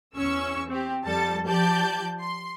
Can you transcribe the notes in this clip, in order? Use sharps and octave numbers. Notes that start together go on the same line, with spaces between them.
E2 C#4 C#6 E6
C4 G4
F2 G3 A4 A5 A6
F3 G4 D5 A5 G6
C6